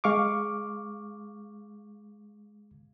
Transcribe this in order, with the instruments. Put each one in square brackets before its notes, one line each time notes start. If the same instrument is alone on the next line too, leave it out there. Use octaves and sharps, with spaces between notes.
[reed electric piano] G#3 F5 C#6 D6